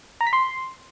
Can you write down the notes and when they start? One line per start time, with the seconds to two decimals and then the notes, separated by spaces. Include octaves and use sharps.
0.21 A#5
0.27 B6
0.33 C6